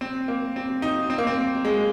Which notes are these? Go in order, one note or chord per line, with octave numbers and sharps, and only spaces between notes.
C4
A#3
C4
D#4
C4
A#3
C4
G#3